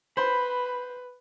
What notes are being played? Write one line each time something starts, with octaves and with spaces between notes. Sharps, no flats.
B4 C5 B5